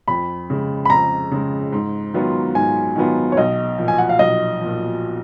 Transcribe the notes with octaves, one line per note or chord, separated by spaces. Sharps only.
F2 B5
C#3 G#3
B5
F2 A#5
C#3 G#3
G#2
D#3 F#3 B3 F4
G#2 G#5
D#3 F#3 B3 F4
C#5
B1 D#5
A#2 F3
G#5
F#5
F5
B1 D#5
A#2 F3